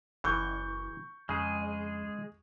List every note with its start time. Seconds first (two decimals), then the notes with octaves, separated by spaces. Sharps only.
0.24 F#1 E3 C#6 G6
1.29 F2 C#3 G#3 G#4